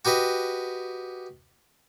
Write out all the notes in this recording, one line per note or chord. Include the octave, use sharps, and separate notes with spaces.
F#4 G4 B4 D#5